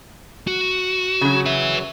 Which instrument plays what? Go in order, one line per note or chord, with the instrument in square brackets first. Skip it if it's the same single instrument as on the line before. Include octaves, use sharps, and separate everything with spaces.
[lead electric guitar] F#4
[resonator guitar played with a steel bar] C#3 F#3
[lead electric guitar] B4 E5